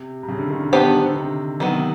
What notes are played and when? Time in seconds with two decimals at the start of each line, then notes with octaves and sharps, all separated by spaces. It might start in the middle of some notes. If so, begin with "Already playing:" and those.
Already playing: C3
0.23 C3
0.28 C#3
0.39 D3
0.50 D#3
0.61 D3
0.72 D#3 B3 D4 G4 C5
0.83 D#3
0.94 D#3
1.05 D3
1.16 C3
1.60 C3 D#3 F#3 B3